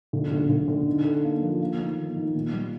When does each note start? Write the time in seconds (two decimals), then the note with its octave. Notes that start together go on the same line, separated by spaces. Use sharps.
0.13 D3
0.32 D3
0.50 D3
0.68 D3
0.87 D#4
1.05 A4
1.24 A#3
1.42 F3
1.60 A#3
1.79 D#3
1.98 A#3
2.16 D#3
2.34 A#2
2.53 G3